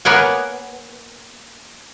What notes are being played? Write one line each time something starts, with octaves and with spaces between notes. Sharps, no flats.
A#3 B3 A#4 C#5 F#5 G#5